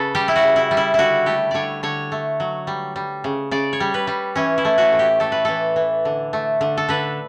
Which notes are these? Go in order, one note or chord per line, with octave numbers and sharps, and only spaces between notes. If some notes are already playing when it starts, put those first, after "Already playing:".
Already playing: C#3 A4 B4
G3 G4
E4
F#4
C#3
E4
G3
E4
D3 E4 F#4
A3 G4
D3 C#5 D5
D3 C#5
A3
F#3
G3
G3
C#3
C#3 D5
C#5
G3
B4
G3
E3 C#4
E4
A3
F#4
A2
G4
A3 A4
B4
E3 A4
E3
D3
A3
D3
A4
D3 B4